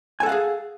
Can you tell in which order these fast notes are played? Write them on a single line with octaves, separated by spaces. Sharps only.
G#5 A4 F#5 F5 G#4